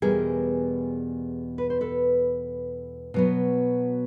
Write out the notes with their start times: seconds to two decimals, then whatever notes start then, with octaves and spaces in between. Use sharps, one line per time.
0.02 E2 B2 G3 G#4 A#4
1.58 B4
1.70 C5
1.81 A4 B4
3.14 B2 F#3 B3